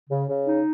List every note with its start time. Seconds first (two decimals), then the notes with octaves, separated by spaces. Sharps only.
0.10 C#3
0.28 C#3
0.46 D#4